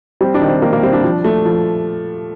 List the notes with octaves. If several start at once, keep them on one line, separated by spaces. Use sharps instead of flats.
G3 C4
D4
D#3
C4
D#3 A#3
A#3
G3 C4
D4
F3
A3
F3